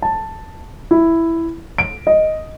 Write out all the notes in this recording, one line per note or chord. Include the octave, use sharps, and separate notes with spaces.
A5
E4
D7
D#5